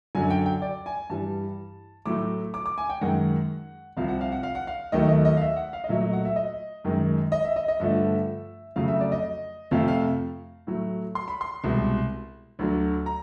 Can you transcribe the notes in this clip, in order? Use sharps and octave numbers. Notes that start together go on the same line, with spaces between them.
F#2 D3 F#3 G#5
G5
G5
D5
G#5
G2 E3 G3 A5
A2 F#3 A3 D6
D6
D6
G#5
G5
F#2 D#3 G#3 F#5
C2 C3 F3 F5
F#5
F5
F#5
F5
F#5
F5
D#2 D#3 F#3 A3 D#5
D#5
D#5
F5
E5
F#5
F5
D#5
A#2 F#3 A3 E5
D#5
F#5
E5
D#5
F#2 D#3 G#3
D#5
E5
D#5
D#5
G2 D3 F3 A3 E5
F2 C#3 F#3 A3 F5
E5
D5
D#5
F2 C3 F3 A3 F5
F5
A2 F#3 A3
C6
B5
C6
C2 B2 G#3
D2 D3 F#3
A#5